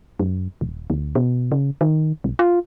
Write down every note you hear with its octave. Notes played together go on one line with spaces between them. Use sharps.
F#2
D#1
D2
B2
C#3
D#3
B1
F4